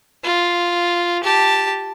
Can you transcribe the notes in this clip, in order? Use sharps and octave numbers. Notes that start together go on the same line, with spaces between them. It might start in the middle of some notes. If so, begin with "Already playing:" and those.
F4
G4 A5